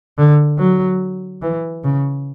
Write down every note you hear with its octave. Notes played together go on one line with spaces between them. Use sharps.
D3
F#3
E3
C#3